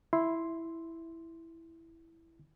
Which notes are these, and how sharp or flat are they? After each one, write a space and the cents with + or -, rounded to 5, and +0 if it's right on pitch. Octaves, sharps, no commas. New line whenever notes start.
E4 +0 C6 +0